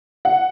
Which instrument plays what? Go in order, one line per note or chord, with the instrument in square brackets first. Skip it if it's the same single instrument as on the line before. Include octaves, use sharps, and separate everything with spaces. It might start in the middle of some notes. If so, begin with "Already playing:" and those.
[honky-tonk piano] F#5